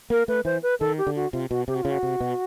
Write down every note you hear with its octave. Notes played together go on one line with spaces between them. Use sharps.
A#3 A#4
A3 B4
E3 C5
B4
D#3 A4
G4
D3
F#4
C3 F4
B2 F#4
C3 G4
F#4
C#3 F4
F#4
C3
B2